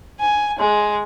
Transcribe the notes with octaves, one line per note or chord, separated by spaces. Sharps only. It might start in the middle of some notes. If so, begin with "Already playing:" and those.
G#5
G#3